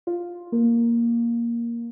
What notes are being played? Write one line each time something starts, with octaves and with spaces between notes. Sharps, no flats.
F4
A#3